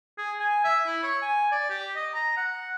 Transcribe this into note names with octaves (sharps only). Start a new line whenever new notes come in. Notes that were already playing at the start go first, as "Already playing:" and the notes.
G#4
G#5
E5
E4
C#5
G#5
D5
G4
D#5
A#5
F#5